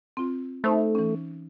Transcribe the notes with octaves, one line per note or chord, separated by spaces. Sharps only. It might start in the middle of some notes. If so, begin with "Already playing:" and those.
C4 F4
A3 D#4 C5 B5
E3 C#4